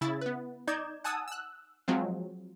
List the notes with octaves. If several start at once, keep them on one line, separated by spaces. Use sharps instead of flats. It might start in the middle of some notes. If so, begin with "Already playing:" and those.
C#3 E4 A6
B3 B4
D#4 D5 G6 G#6 E7
F#5 G#5 A5 D#6 E6 F#6
E6 F#6
F3 F#3 G#3 C4 F4